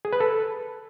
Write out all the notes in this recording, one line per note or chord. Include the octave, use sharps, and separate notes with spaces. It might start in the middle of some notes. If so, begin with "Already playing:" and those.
G#4
B4
A4